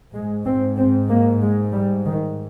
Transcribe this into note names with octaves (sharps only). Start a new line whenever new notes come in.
G#2 G#3
C4
C4
A#3
G#3
G3
D#3